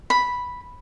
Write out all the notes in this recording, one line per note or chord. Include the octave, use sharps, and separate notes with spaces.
B5